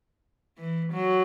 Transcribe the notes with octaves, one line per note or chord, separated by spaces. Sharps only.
E3
F#3